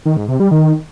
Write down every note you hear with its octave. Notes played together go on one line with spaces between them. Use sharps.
D#3
G#2
C3
G3
D#3